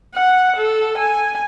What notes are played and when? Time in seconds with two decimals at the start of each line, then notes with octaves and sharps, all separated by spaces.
0.15 F#5
0.56 A4
0.98 G#5